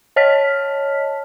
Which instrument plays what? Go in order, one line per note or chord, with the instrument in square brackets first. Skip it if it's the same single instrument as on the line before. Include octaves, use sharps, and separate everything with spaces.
[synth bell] C#5 D#5 A5 F6 B6